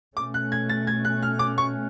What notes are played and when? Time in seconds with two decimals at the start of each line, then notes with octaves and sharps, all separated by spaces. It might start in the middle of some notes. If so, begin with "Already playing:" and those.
0.17 B2 A3 C#4 D6
0.34 F#6
0.52 G#6
0.69 A6
0.87 G#6
1.05 F#6
1.23 F6
1.39 D6
1.58 C#6